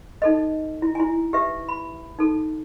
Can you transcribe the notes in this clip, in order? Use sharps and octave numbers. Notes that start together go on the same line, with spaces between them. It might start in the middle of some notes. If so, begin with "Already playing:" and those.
D#4 A4 D#5
E4
E4 G#5
G4 B4 E5
B5
D#4 A4